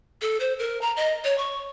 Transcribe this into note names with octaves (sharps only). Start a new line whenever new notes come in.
A4
C5
A#4
A#5
D#5
C#5
C#6